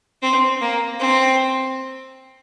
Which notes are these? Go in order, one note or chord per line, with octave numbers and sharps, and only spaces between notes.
C4
A#3
C4